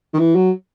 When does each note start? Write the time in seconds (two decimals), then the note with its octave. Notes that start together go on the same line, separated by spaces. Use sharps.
0.14 D#3
0.19 E3
0.35 F#3